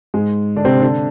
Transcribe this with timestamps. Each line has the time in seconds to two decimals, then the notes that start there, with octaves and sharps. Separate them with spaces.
0.14 G#2 G#3
0.56 D3 D4
0.65 C3 C4
0.82 D3 D4